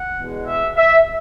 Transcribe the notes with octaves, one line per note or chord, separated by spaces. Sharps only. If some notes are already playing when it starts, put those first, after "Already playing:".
Already playing: F#5
E2 B2 G#3
E5
E5